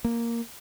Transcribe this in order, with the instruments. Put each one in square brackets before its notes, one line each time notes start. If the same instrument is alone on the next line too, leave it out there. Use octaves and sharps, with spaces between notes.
[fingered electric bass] A#3